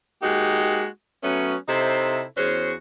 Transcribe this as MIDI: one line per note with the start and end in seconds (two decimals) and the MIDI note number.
0.22 0.85 56
0.22 0.85 58
0.22 0.85 63
0.22 0.85 66
0.22 0.85 67
1.23 1.55 54
1.23 1.55 57
1.23 1.55 59
1.23 1.55 61
1.68 2.22 48
1.68 2.22 63
1.68 2.22 64
1.68 2.22 69
1.68 2.22 72
2.37 2.72 40
2.37 2.72 61
2.37 2.72 66
2.37 2.72 68
2.37 2.72 72